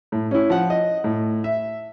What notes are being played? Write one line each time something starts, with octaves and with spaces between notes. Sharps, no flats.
A2
C#4 E4
F3 F#5
D#5
A2
E5